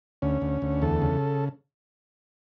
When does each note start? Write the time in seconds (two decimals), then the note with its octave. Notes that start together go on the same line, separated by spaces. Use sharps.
0.22 D2 C#4
0.42 D2
0.62 D2
0.82 E2 A4
1.02 C#3